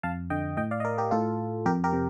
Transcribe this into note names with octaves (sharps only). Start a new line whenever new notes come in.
F2 F5 A5
D3 D#5 G5
A2 D#5 G5
D5 F5
D#5
A#4 D5
G4 A#4
A2 F4 A4
F2 G4 A#4
G4 A#4
C3